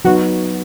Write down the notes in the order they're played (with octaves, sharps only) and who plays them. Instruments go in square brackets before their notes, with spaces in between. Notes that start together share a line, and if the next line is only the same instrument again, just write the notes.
[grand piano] F#3 B3 D#4 [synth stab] F#4